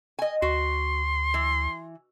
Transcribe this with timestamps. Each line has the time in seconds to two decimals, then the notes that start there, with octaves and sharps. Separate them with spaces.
0.19 D#5 G#5
0.42 D2 F#4 C6
1.34 E3